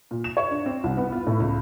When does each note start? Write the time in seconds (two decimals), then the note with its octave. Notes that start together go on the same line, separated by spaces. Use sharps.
0.11 A#2
0.24 E7
0.37 C#5
0.51 D4
0.66 C4
0.84 C2
0.97 B3
1.12 F4
1.27 A2
1.40 C#2